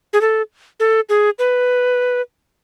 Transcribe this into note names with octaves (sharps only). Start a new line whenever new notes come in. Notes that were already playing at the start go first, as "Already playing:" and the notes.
G#4
A4
A4
G#4
B4